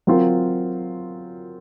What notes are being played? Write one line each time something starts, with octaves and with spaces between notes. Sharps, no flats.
F#3 C4 F4 A#4